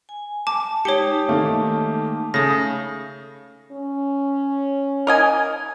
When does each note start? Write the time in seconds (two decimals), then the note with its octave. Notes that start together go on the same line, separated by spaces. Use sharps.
0.09 G#5
0.47 A5 D6
0.85 G#3 D#4 G4 C#5 A5 C#7
1.29 D#3 A3 A#3
2.34 C#3 A3 D#6 A#6
3.72 C#4
5.07 A#4 D#5 G#5